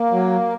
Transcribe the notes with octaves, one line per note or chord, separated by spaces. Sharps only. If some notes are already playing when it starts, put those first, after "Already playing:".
Already playing: A#3
F#3